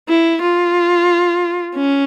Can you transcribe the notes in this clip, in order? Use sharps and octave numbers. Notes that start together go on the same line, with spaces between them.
E4
F4
C#4